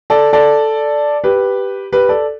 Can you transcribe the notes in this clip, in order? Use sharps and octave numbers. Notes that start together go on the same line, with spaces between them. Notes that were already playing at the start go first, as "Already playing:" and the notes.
A4 D5
A4 D5
G4 B4
G4 B4
A4 D5